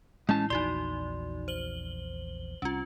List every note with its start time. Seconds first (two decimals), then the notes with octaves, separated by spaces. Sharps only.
0.29 A2 E3 G#3 C#4 E4 A5
0.50 A#1 E2 D#4 F#4 D5 C6
1.48 C5 F#7 G7
2.62 C2 C#4 F4